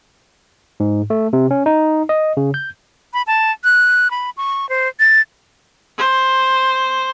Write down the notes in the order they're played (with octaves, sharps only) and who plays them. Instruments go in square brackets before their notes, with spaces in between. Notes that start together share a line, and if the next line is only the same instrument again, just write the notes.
[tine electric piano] G#2
A3
C3
C#4
D#4
D#5
C#3
G6
[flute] B5
A5
F#6
B5
C#6
C5
A6
[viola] C5